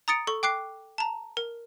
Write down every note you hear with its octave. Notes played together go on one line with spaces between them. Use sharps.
A#5 D#6 A6 C#7 D7
A4 C#6
G5 D6 F#6 C7
A5 A#5
A#4